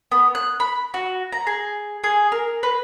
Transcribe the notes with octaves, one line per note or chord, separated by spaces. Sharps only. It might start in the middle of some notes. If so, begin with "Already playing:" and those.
B3
F#6
B5
F#4
A#5
G#4
G#4
A#4
B4